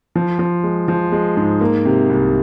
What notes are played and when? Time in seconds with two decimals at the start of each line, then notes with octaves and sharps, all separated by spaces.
0.15 F3
0.39 F3
0.63 G#3
0.88 F3
1.12 G#3
1.37 G#2
1.61 A#3
1.85 C3
2.10 C2